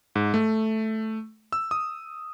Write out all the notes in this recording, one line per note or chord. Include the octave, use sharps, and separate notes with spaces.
G#2
A3
E6
D#6